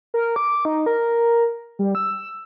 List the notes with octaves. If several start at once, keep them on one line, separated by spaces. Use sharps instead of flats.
A#4
D6
D#4
A#4
G3
E6